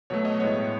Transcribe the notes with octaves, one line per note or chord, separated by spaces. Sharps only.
B2 F#3 A3 C#5
D#5
A2 G#3 B3 C#5